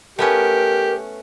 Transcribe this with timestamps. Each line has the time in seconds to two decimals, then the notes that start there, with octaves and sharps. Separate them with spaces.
0.19 A3 B3 C#4 G4 A#4